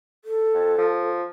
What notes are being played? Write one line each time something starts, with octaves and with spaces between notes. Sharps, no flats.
A4
F2
F3